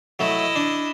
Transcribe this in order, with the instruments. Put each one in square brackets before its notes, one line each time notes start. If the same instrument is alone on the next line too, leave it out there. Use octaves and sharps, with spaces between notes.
[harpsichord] F#3 A3 [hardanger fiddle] E4 D#5
[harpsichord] D4